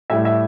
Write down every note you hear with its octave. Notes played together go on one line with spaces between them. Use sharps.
A2 G3 E5
E5